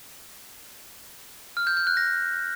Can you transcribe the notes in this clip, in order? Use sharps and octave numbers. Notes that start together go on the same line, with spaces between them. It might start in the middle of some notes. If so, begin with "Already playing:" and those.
F6
G6
G6
F#6
A#6